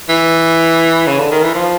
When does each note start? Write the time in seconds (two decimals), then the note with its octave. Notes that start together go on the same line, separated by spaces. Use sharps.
0.09 E3
1.07 C#3
1.19 D3
1.31 D#3
1.43 E3
1.55 F3